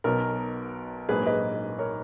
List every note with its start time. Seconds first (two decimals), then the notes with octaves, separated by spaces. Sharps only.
0.04 B1 B2 F#3 B3 A#4
1.09 A#1 G#2 F#3 A#3 G#4 B4
1.26 B4 D#5
1.79 A#4 C#5